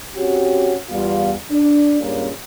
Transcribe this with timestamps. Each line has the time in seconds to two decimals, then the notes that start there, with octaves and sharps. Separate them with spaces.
0.16 C4 C#4 F#4 G4
0.89 E2 G3 B3 F4
1.51 D4
2.00 G2 A#2 G#3 A#3 C#4